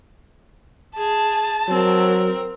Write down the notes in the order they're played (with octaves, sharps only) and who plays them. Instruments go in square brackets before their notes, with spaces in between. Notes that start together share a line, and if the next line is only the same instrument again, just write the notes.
[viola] G#4 [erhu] A5
[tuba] F#3 [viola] C4 A#4